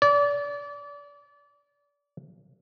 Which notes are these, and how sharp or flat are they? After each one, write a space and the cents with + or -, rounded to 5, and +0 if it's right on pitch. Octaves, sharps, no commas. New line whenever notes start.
D5 -30